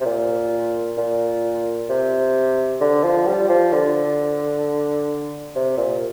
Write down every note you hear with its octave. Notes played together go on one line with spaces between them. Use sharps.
C3
A#2
A#2
C3
D3
F3
G3
F3
D3
C3
A#2